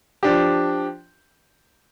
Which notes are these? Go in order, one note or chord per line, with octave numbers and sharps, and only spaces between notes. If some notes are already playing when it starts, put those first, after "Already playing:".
F3 D4 G4